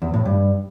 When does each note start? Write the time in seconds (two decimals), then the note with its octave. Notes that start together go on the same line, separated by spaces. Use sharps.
0.02 E2
0.14 A2
0.26 G2